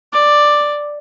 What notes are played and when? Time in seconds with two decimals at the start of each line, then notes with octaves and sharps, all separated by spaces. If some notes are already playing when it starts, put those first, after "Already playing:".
0.13 D5